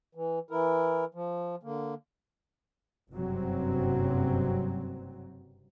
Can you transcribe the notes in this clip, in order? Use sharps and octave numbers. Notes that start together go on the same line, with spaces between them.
E3
E3 E4 A#4
F3
D3 A#3
F#1 G2 C3 F#3 C4